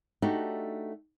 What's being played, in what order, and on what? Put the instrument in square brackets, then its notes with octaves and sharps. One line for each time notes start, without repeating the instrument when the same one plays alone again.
[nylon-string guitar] A3 D4 D#4 F#4 G4